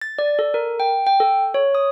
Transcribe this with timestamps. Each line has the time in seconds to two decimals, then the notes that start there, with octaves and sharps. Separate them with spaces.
0.01 A6
0.19 D5
0.39 A4
0.54 A#4
0.80 G5
1.07 G5
1.20 A4
1.54 C#5
1.75 D#6